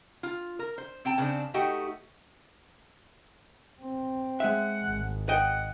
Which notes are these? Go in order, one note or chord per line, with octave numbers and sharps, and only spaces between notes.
F4
A#4
C5
C4 G5 A5
C#3 C4 D4
A3 D#4 F#4 G4
C4
G#3 E5 F#5
G#1
D#5 F#5 G5